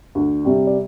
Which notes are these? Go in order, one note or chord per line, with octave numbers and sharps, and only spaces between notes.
D2
C3 G3
D5